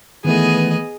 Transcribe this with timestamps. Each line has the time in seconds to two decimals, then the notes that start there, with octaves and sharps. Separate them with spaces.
0.25 D#3 E3 A3 B3 G#4 D#5